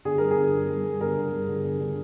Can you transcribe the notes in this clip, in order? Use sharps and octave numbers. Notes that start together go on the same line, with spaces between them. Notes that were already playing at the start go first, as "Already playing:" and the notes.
D3 G#4
G2 A#4
G#4
D3
G2
G2
G2
D3 A#4
D3
G2
D3
D3
D3